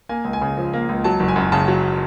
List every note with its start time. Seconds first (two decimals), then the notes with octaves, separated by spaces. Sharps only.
0.09 A#3 G#5
0.25 C#2
0.33 G#5
0.41 C#3
0.57 F3
0.73 A#3
0.89 C#2
1.04 F#3 A5
1.20 F#1
1.28 G#5
1.36 F#2
1.52 C#3 A5
1.68 F#3